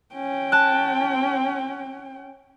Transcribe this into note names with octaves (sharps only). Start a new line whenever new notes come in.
C#4 G5
A5 F#6